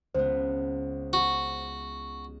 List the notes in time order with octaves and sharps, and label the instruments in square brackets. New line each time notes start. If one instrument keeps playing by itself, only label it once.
[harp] C#2 B3 [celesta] C5
[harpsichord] F#4